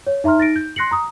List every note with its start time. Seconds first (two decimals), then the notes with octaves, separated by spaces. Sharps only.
0.07 C#5
0.24 D#4 E5 A#5 C6 F6
0.38 D#4 A6 A#6 D7
0.56 G6
0.76 C6 F#6 A#6 C7 C#7 F#7
0.91 A#5 D#6